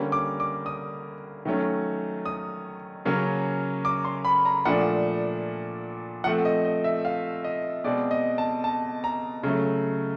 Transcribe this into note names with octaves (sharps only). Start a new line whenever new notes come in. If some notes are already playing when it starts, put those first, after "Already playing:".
Already playing: D3 G3 A#3 C#4
D6
D6
D#6
D#3 F#3 A3 C#4
D#6
C#3 F#3 A#3 C#4
D6
C6
B5
A#5
A#2 F3 A3 D4 F#5
F3 A3 C4 F#5
D#5
D#5
E5
F5
D#5
B2 G#3 C4 D5
D#5
A5
A5
A#5
C#3 F#3 A3